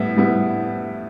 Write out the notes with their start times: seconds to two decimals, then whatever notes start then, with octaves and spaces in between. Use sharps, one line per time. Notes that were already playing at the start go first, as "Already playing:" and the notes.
Already playing: A2 G3 B3 E4 E5
0.16 A2 G3 B3 E4